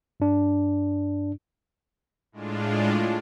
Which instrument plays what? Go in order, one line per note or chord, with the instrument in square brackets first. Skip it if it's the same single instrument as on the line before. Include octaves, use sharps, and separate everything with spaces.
[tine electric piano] G2 D4
[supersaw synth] A2 G#3 D4 F4